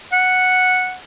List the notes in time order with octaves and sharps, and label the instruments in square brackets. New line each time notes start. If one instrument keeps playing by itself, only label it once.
[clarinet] F#5